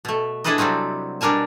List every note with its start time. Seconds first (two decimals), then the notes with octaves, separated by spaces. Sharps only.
0.05 B2 A3
0.44 D4 E4 G#4 A4 B4 D#5
0.58 C3 F#3 G3 C4 F#4
1.21 B2 G3 D4 A#4 G#5 A5